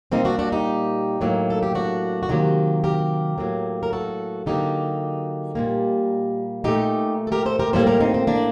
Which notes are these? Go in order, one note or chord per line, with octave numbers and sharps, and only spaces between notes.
A#2 G3 A#3 C4 D#4
D4 F#4
D4 F#4
D#4 G4
A2 F#3 A#3
A4
G4
D4 F#4
F#4
C3 D#3 F#3 A#3 D#4 G4
G4 A#4
A2 F#3 A#3
A#4
F#4 A4
D3 F#3 A#3 D#4 G4
A#2 G3 A#3
A#2 A3 D#4 G4
A4
G4 A#4
A4 C5
G4 A#4
A2 G3 A#3 A4 C5
G4 A#4
C4 D#4
C4
A#3 D4